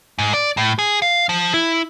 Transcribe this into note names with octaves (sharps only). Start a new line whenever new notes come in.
G#2
D5
A2
G#4
F5
F3
E4